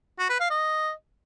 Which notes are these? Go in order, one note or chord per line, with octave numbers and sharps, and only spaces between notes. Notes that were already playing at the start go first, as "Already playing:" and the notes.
F#4
B4
F5
D#5